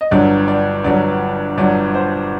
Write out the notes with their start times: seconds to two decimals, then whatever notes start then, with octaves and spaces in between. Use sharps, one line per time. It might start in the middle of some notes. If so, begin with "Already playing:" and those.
0.01 D#5
0.11 G1 G2 F#3 D5
0.48 D5
0.84 G1 G2 F#3 D5
1.57 G1 G2 F#3 D5
1.94 C5